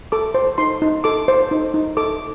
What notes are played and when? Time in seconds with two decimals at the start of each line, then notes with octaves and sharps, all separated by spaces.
0.12 A4 D6
0.34 C5
0.58 D#4 C6
0.82 D#4
1.04 A4 D6
1.28 C5
1.51 D#4
1.74 D#4
1.97 A4 D6